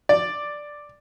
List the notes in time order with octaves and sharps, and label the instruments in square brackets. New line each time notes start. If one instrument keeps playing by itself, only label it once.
[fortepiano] D5